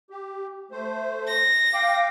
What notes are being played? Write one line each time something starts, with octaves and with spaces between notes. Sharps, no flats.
G4
A3 C5
A#6
F5 G5 D6